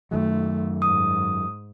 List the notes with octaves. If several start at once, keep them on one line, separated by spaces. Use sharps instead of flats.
F#2 D#3 F#3 A3
G#2 D#6